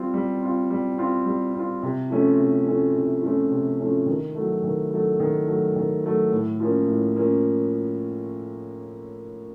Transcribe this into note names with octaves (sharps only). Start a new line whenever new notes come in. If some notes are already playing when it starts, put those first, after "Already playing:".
Already playing: G3 C4 F4
G3
C4 F4
G3
C4 F4
G3
C4 F4
C3
F3 A3 C#4
C3
F3 A3 C#4
C3
F3 A3 C#4
C3
F3 A3 C#4
D#3
F#3 A3
D#3
F#3 A3
D#3
F#3 A3
D#3
F#3 A3
A2
F3 A#3 C#4
A2
F3 A#3 C#4